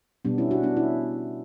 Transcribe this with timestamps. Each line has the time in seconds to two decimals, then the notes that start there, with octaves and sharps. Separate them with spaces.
0.25 B2 G3 B3 D4
0.38 C#4 E4
0.51 D4 F#4
0.63 B3 D4
0.76 C#4 E4